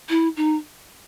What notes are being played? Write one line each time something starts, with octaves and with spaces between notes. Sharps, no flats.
E4
D#4